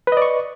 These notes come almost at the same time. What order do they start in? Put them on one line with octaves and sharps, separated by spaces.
B4 D#5 D5 C#6